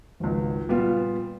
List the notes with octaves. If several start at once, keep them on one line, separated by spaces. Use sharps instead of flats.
G#1 C#2
A#2 G3 B3 F4